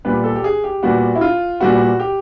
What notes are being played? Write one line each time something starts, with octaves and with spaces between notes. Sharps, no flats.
A#2 G3 B3 B4
A4
G4
G#4
G4
A#2 G3 B3 F#4
E4
F4
A#2 G3 B3 F#4
G4